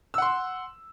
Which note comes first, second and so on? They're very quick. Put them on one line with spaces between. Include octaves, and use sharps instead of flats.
E6 F#5 C6